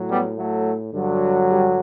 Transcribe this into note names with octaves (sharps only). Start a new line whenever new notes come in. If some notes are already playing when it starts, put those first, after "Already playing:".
Already playing: A2 F#3
G3 B3
F#3 A3
G2 D3 F#3
G3